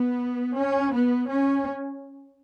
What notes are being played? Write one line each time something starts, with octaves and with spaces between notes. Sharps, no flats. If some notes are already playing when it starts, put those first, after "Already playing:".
Already playing: B3
C#4
B3
C#4